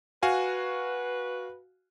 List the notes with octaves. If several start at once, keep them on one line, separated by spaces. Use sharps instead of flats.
F#4 B4 F5 G#5